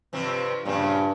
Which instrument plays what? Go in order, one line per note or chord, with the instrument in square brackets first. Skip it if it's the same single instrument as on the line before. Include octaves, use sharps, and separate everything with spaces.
[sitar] G2 C3 F3
[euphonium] G2 [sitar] A#2 C#3 F3